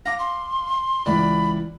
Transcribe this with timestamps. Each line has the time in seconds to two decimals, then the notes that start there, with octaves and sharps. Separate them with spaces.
0.06 F5 D6 A#6
0.19 C6
1.06 C#2 E3 D5 B5